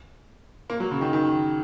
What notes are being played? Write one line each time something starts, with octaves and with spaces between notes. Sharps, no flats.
A#3
F#3
C#3
D#3
D#3